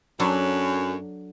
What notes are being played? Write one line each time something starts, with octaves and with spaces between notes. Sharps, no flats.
F#2 F#3 D4 A4